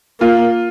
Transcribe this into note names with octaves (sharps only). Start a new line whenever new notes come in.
A#3 F4